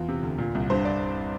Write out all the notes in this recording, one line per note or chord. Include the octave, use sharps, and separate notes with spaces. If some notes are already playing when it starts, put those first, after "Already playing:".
Already playing: E2 F4
C3
D2
A#2
C2
G2 C5
D5